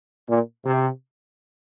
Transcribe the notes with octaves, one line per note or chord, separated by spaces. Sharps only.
A#2
C3